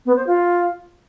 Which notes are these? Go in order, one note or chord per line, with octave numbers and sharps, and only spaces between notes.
B3
C5
F4